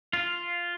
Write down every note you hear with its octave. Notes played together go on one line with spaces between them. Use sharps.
F4